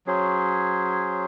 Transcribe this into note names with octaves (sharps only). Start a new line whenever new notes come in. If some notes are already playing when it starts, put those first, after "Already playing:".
F#3 C#4 G#4 C5